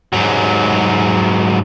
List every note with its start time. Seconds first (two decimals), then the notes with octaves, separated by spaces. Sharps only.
0.13 G#2 F#3